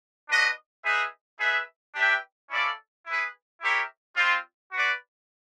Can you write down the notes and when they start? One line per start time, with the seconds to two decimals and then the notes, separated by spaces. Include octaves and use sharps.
0.29 D4 F#4 B4 D#5
0.84 D#4 G#4 B4 E5
1.40 D#4 G#4 B4 E5
1.95 D4 G4 B4 E5 G5
2.50 C#4 E4 A4 D5 F5
3.05 E4 G#4 B4
3.61 E4 G4 A#4 C#5 E5
4.16 G3 C4 F4
4.72 F#4 B4 D5